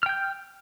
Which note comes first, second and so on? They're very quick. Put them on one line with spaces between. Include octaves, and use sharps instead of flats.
F6 G5 G6